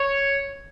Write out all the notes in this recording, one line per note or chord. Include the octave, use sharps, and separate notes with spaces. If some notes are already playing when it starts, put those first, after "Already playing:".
Already playing: C#5